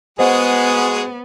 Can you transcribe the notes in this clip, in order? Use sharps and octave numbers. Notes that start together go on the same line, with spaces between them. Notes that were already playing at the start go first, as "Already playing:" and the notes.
G#3 B3 F#4 G#4 C5 D#5 F#5